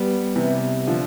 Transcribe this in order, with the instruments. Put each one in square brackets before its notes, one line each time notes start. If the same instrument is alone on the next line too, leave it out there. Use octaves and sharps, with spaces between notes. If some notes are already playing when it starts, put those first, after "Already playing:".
Already playing: [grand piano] G3 B3
C3 E3
D3 F3